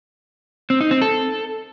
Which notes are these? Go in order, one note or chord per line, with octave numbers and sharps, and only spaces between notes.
C4
D#4
C4
A4